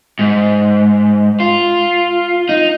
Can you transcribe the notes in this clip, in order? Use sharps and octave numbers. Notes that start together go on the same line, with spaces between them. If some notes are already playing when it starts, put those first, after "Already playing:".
G#2
F4
D#4